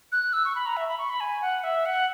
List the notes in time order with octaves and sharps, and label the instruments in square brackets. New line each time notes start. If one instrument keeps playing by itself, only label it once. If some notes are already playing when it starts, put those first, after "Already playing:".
[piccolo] F#6
E6
C#6
B5
A#5
E5
B5
C#6
B5
G#5
F#5
E5
F#5